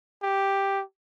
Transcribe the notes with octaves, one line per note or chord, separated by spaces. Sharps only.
G4